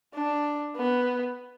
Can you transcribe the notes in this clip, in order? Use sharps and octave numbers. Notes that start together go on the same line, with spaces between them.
D4
B3